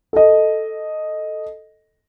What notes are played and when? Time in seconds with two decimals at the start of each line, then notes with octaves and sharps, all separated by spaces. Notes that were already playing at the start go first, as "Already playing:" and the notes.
0.13 A4 D#5